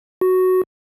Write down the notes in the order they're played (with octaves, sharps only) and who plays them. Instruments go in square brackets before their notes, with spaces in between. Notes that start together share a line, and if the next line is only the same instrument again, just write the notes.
[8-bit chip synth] F#4